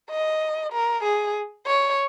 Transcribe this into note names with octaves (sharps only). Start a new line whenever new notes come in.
D#5
A#4
G#4
C#5